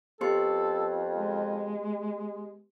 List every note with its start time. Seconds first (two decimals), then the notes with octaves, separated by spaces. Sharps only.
0.21 F2 B3 G4 A4 C6
1.16 G#3